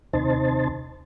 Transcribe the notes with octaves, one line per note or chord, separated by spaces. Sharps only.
D#2 C3 D#4 C5 A5